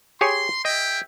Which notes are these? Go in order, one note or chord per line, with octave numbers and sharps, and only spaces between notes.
G4 G#4 C#5 C6
G#4 D#5 E5 G5